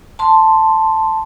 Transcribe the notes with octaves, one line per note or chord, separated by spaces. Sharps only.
A5 C6